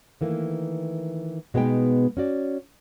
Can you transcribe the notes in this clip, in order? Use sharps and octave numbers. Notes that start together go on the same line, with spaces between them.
D#3 E3 A3 A#3
B2 G#3 B3 D#4 G5
C#4 F#4 D5